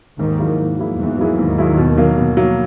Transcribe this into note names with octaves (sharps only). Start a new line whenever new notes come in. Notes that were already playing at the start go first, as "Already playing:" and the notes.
D#2 G#2 D#3
F#3 A#3 E4 G#4
G#2
F#3 A#3 E4 G#4
E2 G#2 E3
F#3 A#3 E4 G#4
D#2 G#2 D#3
F#3 A#3 E4 G#4
B2
F#3 A#3
B2
F#3 A#3